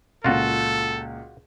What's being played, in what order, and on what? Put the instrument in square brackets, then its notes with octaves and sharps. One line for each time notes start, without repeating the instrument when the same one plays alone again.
[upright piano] C#2 A#2 [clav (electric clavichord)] F4 F#4 [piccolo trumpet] A4